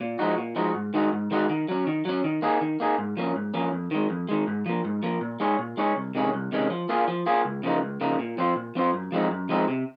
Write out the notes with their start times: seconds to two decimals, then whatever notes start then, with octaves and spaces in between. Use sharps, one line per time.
0.01 A#2
0.19 F3 G#3 D#4 F#4
0.38 A#2
0.56 F3 G#3 D#4 F#4
0.75 G#2
0.94 D#3 G#3 D#4 F#4
1.12 G#2
1.31 D#3 G#3 D#4 F#4
1.50 D#3
1.68 F#3 C#4
1.87 D#3
2.05 F#3 C#4
2.24 D#3
2.42 A#3 D#4 G#4
2.61 D#3
2.80 A#3 D#4 G#4
2.98 G#2
3.17 F3 A#3 C#4
3.36 G#2
3.54 F3 A#3 C#4
3.73 F2
3.91 D#3 G#3
4.10 F2
4.29 D#3 G#3
4.47 G#2
4.66 F3 A#3
4.85 G#2
5.03 F3 A#3
5.21 A#2
5.40 G#3 D#4 G#4 C#5
5.59 A#2
5.77 G#3 D#4 G#4 C#5
5.96 C2
6.15 C3 D#3 G#3 C#4
6.33 C2
6.52 C3 D#3 G#3 C#4
6.70 F3
6.89 A#3 F4 G#4
7.08 F3
7.26 A#3 F4 G#4
7.45 C#2
7.63 C#3 F3 A#3 D#4
7.82 C#2
8.01 C#3 F3 A#3 D#4
8.19 A#2
8.38 F3 C4 F4 C5
8.56 A#2
8.75 F3 C4 F4 C5
8.94 F#2
9.12 F3 G#3 C4 D#4
9.31 F#2
9.49 F3 G#3 C4 D#4
9.68 C3